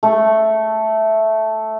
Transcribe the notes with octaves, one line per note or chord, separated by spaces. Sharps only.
A3